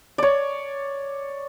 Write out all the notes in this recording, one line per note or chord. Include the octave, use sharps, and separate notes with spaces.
C#5 D5